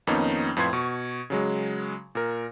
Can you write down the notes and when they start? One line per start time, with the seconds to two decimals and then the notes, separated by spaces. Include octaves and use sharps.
0.07 F2 D#3 A#3 B3 C#4 D#4
0.57 F2 A2 F4 B4 C6 G#6
0.73 B2 C#6
1.30 C#3 F#3 G#3
2.15 A#2 A#4